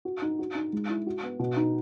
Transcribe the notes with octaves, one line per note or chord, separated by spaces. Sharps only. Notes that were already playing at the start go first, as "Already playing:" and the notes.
F#4
D#4
F#4
D#4
G#3
E4
F#4
B3
B2
D#4